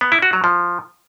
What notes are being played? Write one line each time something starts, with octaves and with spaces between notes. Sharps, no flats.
B3
E4
F#4
F#3
F3